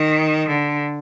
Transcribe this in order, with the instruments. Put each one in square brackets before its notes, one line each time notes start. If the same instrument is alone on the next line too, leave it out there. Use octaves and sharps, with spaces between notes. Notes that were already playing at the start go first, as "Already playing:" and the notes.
Already playing: [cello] D#3
D3